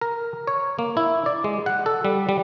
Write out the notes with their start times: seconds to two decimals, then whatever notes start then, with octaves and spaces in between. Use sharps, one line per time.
0.01 A#4
0.47 C#5
0.79 A#3
0.97 E4
1.26 D5
1.44 G#3
1.66 F#5
1.86 A4
2.05 G3
2.29 G3